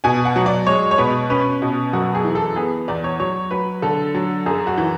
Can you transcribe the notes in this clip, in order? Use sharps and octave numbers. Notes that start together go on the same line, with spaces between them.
B2 G#5
F#5
F#3
D5
G#3 C#5
C#5
B2 B4
C#4 B4
B2
F#2 F#4
G#4
E3
A4
B3 G#4
E2 D5
C#5
F#3 C#5
F#3 B4
D3 A4
F#3
F#2 G#4
F#4
E3